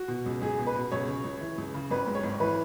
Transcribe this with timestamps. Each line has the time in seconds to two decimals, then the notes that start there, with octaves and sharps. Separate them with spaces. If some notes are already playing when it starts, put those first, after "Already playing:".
Already playing: F#4
0.08 B2
0.26 C#2
0.41 C#2 G#4
0.59 B2
0.67 B4
0.76 B2
0.92 C#2 C#5
1.08 C#3
1.24 C#2
1.40 E3
1.58 C#2
1.74 C#3
1.91 G#1 B4
2.07 G#2
2.15 C#5
2.23 G#1
2.40 E3 B4